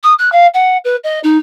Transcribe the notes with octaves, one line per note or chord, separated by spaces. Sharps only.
D#6
F#6
F5
F#5
B4
D#5
D#4